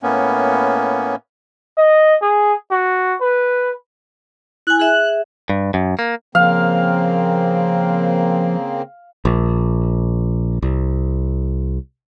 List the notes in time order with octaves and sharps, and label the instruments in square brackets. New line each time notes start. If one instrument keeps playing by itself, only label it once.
[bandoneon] A2 A#3 B3 C#4
[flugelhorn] D#5
G#4
F#4
B4
[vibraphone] E4 G#5 [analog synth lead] F#6
[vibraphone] G#4 E5 [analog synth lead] F#6
[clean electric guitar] G2
F#2
A#3
[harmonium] C#3 A#3 C4 [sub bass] F3 [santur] F5
[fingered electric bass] A#1
C2